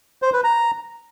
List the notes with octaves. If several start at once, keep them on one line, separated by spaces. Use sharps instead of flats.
C5
B4
A#5